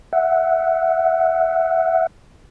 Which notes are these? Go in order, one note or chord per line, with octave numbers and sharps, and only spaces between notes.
E5 F#5